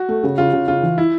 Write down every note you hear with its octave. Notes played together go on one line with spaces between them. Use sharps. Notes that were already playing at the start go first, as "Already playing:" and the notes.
Already playing: F#4
A3
C#3
C#3 F4
C#3
C#3 F4
E3
E4